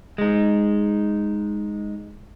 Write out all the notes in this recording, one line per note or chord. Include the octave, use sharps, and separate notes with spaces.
G#3 D#4